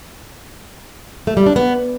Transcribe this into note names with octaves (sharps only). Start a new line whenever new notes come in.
A3
G3
D4
B3